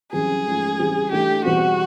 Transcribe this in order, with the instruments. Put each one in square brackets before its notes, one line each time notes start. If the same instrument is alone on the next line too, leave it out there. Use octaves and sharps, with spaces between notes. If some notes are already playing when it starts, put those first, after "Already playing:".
[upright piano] F#2 C#3 E3 G3 C4 [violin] G#4
[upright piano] G#2 F3 A3 C#4 F4
C#3 E3 G3 C4
[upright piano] E3 A3 D4 [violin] G4
[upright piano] E2 B2 G3 C4 [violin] F#4